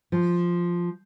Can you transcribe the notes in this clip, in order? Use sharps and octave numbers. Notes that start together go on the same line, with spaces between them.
F3